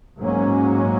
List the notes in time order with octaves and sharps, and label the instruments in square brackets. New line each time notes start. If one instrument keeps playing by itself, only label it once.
[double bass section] G#2 F#3 A#3 C#4